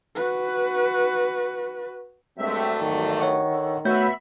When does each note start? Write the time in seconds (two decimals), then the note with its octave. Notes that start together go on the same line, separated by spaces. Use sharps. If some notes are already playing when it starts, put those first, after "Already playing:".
0.15 F#4 B4
2.38 G2 F#3 G#3 A3 C4 E5
2.81 E2 G#2 D#3
3.20 C#5 F#5 C#6
3.49 D3
3.85 A3 B3 F#4 B4 C#5 E5 B5 G6